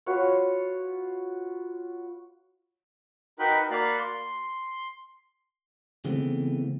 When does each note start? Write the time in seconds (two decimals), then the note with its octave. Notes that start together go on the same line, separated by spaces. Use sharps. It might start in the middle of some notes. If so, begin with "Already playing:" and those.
0.06 F4 F#4 B4 C#5
3.39 D#4 F#4 A#4 B4 G5 B5
3.71 A#3 F#4 D5 F5 B5
3.98 C6
6.05 C#3 E3 G#3 A3 B3 C4